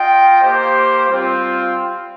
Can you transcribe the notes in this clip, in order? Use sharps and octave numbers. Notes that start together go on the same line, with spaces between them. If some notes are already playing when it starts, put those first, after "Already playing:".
Already playing: F4 D#5 G5
A#3 G4 C5
G3 C4 F4